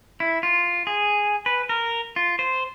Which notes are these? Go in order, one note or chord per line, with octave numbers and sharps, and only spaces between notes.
E4
F4
G#4
B4
A#4
F4
C5